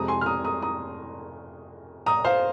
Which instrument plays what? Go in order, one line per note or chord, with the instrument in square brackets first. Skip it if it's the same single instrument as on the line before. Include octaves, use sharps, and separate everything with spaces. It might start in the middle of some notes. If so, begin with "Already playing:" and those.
Already playing: [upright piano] F2 C3 G#3 A#5 D#6
G#5 C6
F6
A#5 D#6
A#5 D#6
A#5 D#6
A#5 D#6
C5 F5